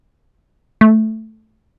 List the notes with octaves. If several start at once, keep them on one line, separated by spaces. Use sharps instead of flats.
A3